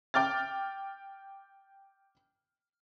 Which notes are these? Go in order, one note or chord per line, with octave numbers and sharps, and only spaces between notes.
G5 D6 F6 A6